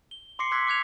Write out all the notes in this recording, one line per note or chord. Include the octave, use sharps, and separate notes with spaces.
G7
C6 D6 A#6 C7 C#7
C6 D6 E6 F#6 G#6 B6
D6 F#6 G#6 F7